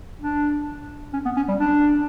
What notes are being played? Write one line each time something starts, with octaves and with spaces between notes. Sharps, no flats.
D4
C#4
B3
C#4
G3
D4